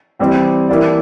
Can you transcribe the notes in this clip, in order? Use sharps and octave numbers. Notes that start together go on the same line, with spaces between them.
E3 G3 C4 G4
E3 A#3 E4 G4 D5